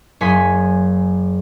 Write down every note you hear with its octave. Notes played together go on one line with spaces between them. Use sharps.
F#1 C#5 G#5 C6 D#6 B6